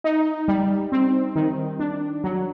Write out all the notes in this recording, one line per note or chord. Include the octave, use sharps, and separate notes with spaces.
D#4
G3
C4
D#3
D4
F#3